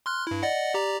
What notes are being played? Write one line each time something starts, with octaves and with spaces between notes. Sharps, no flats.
C6 F6 F#6
G2 E4
D5 D#5 F#5
G4 D5 A#5